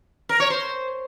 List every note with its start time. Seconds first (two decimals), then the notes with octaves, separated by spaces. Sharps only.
0.29 A#4
0.40 C#5
0.50 C5